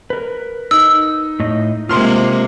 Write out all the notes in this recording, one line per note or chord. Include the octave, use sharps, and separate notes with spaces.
A#4 B4
D#4 E6
A2 D#5
C3 G#3 A#3 F4 C6 F6